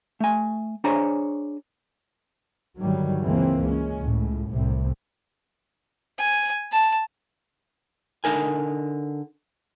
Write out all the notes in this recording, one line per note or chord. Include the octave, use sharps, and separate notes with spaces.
A3 G#5
D4 G#4 C5 C#5 G#5 A#5
G2 D3 D#3 F#3 G3
C#2 E3 G#3 A#3 C4
G#3 C#4
C#2 A2
C2 A2 C3
G#5
A5
D3 D#4 A#4 G#5